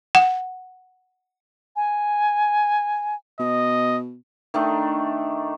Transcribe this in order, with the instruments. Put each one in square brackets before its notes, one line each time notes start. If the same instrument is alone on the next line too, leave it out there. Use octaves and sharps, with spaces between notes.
[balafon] F#5
[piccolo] G#5
[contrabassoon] B2 [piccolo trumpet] D#5
[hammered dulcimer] D#3 A3 D4 D#4